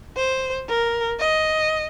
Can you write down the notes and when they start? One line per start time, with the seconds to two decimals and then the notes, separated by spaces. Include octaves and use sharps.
0.16 C5
0.69 A#4
1.20 D#5